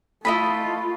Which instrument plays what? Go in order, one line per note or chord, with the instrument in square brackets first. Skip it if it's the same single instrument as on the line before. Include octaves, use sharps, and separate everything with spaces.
[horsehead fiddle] A3 F4 [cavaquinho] E4 D#5 B5